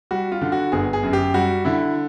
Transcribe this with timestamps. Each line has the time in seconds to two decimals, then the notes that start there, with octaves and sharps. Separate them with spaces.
0.11 G3 F#4
0.32 F4
0.41 D3
0.52 F#4
0.72 G1 G#4
0.93 G#4
1.03 F#2
1.13 G4
1.34 G3 F#4
1.65 D3 E4